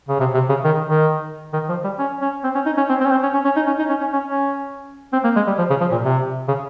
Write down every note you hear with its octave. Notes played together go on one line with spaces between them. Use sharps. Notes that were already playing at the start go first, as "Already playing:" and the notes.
C#3
C3
C3
C#3
D#3
D#3
D#3
F3
G3
C#4
C#4
C4
C#4
D#4
C#4
C4
C4
C#4
C4
C#4
C#4
C#4
D#4
C#4
D#4
C#4
C#4
C#4
C#4
C4
A#3
G#3
G3
F3
C#3
F3
A#2
C3
C#3